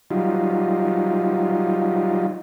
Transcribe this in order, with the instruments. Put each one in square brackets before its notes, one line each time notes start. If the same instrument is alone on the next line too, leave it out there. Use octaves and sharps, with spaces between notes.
[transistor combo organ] F#3 G3 D#4 F4